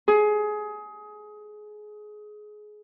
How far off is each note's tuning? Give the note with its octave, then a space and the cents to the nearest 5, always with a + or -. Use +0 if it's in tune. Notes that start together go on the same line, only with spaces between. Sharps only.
G#4 +20